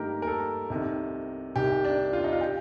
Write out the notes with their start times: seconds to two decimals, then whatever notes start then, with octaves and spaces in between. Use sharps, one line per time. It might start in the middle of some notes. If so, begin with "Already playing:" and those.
Already playing: G2 D#3 A3 A#3 G4 A#4
0.22 A#4
0.27 A4
0.70 C2 C3 D#3
1.55 C2 C3 D#3 G4
1.85 D4
2.13 F4
2.24 D#4
2.33 F4
2.41 G4